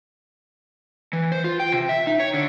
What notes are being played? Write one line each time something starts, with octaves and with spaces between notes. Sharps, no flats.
E3
C5
F4
G5
C3
E5
D#4
C#5
D3